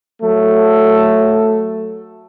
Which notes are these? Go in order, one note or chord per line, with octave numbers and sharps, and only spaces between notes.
F#3 A3 A4